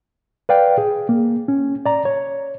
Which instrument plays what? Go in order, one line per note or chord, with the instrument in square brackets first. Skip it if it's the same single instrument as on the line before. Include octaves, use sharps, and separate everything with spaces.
[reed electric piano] B4 D5 F5 G5
G#4
A#3
C#4
D5 A#5
C#5